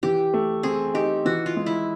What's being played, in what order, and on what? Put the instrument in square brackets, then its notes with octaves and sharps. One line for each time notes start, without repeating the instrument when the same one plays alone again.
[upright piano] E3 [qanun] G4
[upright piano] A3
[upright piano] C4 [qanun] G#4
[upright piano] D#4 [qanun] G4
[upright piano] E3 [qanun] F#4
[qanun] F4
[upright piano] G#3
[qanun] E4